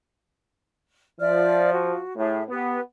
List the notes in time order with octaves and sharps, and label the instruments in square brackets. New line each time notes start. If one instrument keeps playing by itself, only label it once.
[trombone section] F3 [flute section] D5 E5 F6
[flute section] F#4
[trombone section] A2 [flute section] G#4 E5
[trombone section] B3 [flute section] G4 B4